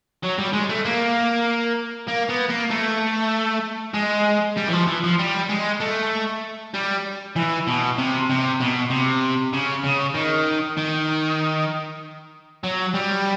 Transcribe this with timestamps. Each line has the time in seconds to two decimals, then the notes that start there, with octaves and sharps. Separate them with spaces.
0.23 F#3
0.38 G3
0.53 G#3
0.69 A3
0.85 A#3
2.08 A#3
2.30 B3
2.50 A#3
2.71 A3
3.94 G#3
4.57 G3
4.68 E3
4.73 F3
4.87 E3
5.04 F3
5.19 G3
5.49 G#3
5.80 A3
6.74 G3
7.36 E3
7.67 B2
7.98 C3
8.29 C3
8.60 B2
8.90 C3
9.53 C#3
9.84 C#3
10.14 D#3
10.77 D#3
12.64 F#3
12.94 G3